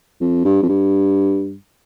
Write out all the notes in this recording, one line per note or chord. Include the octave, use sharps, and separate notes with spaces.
F2
G2
F2
G2